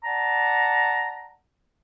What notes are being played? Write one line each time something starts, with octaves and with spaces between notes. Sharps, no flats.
D5 F#5 A5 A#5